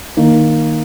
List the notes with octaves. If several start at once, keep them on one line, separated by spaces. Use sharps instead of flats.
D#3 A#3